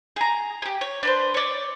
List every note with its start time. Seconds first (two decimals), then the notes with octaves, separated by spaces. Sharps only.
0.16 G#4 A#5
0.62 G4 G#4
0.81 C#5
1.03 D4 B4 C5
1.34 C#5 D5